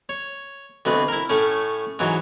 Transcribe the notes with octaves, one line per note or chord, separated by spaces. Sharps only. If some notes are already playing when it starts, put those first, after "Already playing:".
C#5
D2 B2 C4 B4
E4 A#4
A2 A3 C#4
G#2 E3 F#3